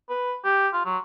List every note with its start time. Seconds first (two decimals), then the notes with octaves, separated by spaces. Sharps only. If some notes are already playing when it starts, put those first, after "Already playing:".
0.10 B4
0.44 G4
0.73 F4
0.86 F#3